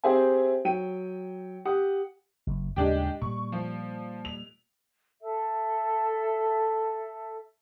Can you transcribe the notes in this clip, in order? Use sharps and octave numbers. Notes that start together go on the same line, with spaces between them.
C4 G4 G#4 C5 E5 G#5
F#3 G5 D#7
G4 F#5 D#6
F#1
D#2 A2 C#3 G#3 D4 G4
A#2 G3 C#6
F3
F7
A4 E5